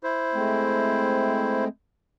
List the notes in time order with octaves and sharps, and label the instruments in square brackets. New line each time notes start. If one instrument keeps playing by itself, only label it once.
[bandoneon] E4 C5
[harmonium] G#3 A3 C4